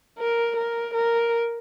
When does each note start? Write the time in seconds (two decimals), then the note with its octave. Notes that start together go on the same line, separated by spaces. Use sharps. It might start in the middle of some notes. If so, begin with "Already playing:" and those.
0.19 A#4
0.56 A#4
0.94 A#4